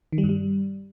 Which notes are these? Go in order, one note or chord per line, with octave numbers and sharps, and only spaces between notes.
D#3
G3
G2
G3